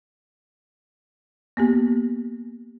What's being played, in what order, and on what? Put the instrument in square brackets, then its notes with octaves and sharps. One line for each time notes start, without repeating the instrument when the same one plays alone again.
[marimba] A#3 B3 G4